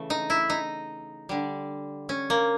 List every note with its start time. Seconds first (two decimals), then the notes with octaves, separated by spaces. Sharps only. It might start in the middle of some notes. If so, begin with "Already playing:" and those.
Already playing: C#3 E3 A3
0.10 D#4
0.30 E4
0.50 D#4
1.29 D3 G3
2.09 C#4
2.30 A#3